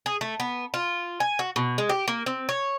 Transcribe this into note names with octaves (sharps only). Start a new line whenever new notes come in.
G#4
A3
B3
F4
G#5
F#4
B2
G#3
G4
A#3
C4
C#5